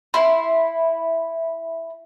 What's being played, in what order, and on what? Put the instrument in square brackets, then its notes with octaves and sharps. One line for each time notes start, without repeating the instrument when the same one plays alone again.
[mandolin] E4 C6